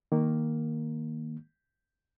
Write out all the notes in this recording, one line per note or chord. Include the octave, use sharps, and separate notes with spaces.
D#3 A#3